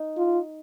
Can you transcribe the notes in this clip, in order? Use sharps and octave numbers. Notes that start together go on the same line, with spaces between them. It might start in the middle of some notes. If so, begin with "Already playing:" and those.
Already playing: D#4
F4